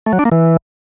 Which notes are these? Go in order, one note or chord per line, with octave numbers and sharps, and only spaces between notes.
A3
F#3
D4
A#3
E3